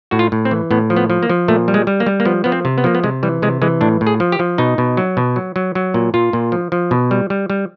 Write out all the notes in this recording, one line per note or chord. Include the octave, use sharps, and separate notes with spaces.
A2 F#4
F4
A2
C4
E3
A2 B3
F3
B3
F3
A#3
F3
A#2 A3
G3
G#3
G3
A#3
G3
A#3
F3 B3
F3 B3
C4
C3
B3
F3 A#3
B3
C3 G#3
E3 G3
C3 G#3
E3 G#3
A2 D4
A2
G#4
F3
G4
F3
B2 D#4
B2
F#3
B2
F#3
F#3
F#3
A#2
A#2 F4
A#2
F3
F3
B2
G3
G3
G3